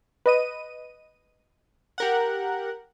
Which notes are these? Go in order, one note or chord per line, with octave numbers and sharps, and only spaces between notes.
B4 D#5 D#7
G4 A#4 F#5